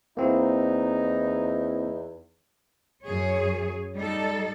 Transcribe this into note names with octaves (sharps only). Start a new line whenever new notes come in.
E2 A#3 C4 D#4 E4
F#2 G#4 C#5
G3 D#4 A4